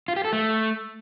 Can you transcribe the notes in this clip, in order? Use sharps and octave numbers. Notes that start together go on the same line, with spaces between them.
F4
G4
A4
A3